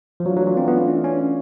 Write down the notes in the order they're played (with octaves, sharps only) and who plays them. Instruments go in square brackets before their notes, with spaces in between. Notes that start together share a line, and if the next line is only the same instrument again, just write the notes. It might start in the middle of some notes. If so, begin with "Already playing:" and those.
[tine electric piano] F3
[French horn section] E3 A3 D4 F4 [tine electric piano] F#3
[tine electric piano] F#3
F#3
C4
B3
C4
C#4
C#4